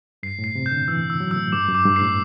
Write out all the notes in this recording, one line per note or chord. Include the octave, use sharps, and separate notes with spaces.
G2 C7
A2
C7
C3
G6
D3
E3 E6
E6
F#3
E6
A2
G2 D6
F#2
D6
G2
C7
A2